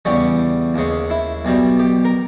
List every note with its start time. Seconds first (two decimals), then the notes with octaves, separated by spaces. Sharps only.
0.05 E2 C#3 G3 C#4
0.74 D#2 C#3 G#3
1.10 E4
1.45 B1 B2 G3
1.79 G4
2.05 A#4